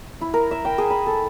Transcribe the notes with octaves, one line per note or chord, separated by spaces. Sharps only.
E4
A#4
E5
G5
G#4
B5
A4